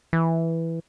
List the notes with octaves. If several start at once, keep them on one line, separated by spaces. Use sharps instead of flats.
E3